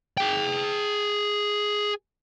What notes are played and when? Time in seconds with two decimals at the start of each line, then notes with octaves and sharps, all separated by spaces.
0.17 G#4 G5